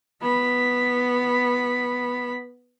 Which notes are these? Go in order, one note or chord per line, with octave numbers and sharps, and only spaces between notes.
B3 B5